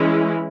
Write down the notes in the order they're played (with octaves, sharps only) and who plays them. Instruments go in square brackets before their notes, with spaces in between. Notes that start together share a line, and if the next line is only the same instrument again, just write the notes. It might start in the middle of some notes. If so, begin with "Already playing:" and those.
Already playing: [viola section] E3 G#3 C#4 E4